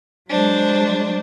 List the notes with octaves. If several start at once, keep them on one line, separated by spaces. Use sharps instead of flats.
F#3 G#3 D4 C5